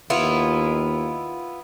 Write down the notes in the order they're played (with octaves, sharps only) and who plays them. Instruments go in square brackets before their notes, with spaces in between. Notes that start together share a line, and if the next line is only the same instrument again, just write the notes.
[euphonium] D#2 [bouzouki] B3 E4 F4